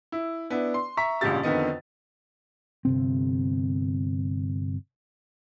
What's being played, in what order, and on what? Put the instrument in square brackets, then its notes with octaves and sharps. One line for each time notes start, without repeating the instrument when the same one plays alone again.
[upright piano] E4
B3 D4 E4
C6
E5 A#5 C#6 B6
A1 G2 A#2 C#3 G4 A6
F2 D3 D#3 B3 D#5
[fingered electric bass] G1 C3 C4